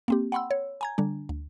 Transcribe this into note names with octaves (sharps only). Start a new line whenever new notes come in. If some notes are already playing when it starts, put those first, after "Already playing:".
A#3 C4 G4
F#5 G5 B5 C6 E6
C#5
G#5 A#5 G#6
D3 G3 D4
D2